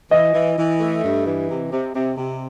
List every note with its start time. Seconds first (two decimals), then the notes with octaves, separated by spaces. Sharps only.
0.11 E3 D#5
0.34 E3
0.57 E3
0.80 A3
1.03 G2
1.26 E3
1.49 C3
1.72 C3
1.94 C3
2.17 C3